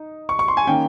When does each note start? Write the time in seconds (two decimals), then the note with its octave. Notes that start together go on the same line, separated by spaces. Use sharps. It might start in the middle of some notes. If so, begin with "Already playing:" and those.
Already playing: D#4
0.29 C#6
0.39 C#6
0.48 C6
0.57 G#5
0.67 D#3 A#3 C#4 G5